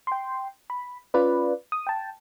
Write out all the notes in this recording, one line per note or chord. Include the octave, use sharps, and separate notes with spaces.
G5 C6
B5
C#4 F4 B4 D5
D#6
G5 A5